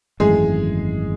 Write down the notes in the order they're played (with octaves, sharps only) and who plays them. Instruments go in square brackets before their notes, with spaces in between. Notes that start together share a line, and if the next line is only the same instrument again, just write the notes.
[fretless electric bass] G#1 F#2 E3 A3 [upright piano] G#3 G#4